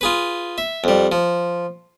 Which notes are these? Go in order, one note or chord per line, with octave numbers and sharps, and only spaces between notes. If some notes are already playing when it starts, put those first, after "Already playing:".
F4 G#4 B4
E5
F2 G3
F3